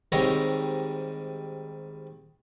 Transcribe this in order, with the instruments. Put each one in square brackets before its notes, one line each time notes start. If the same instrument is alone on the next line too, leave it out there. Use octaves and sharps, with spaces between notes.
[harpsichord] G#2 D#3 G3 C4 C#5 A#5